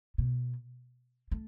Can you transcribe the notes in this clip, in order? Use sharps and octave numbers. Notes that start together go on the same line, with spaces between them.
B2
A3